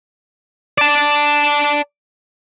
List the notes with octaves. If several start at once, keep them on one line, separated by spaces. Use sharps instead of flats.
D5 A5